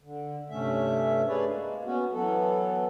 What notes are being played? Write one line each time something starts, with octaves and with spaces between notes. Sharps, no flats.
D3
G2 C3 A3 C#4 E5
A3 D4 G#4 B4 C#5 D5
G#3 A#3
B3 C#4 F#4
E3 F#3 B3 A4